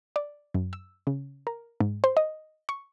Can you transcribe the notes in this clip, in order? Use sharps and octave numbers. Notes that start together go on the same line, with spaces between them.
D5
F#2
E6
C#3
A#4
G#2
C5
D#5
C#6